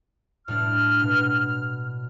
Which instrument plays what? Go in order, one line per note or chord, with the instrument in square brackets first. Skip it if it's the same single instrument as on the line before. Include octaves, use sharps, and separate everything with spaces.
[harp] A2 G3 D4 [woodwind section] F6
[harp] B2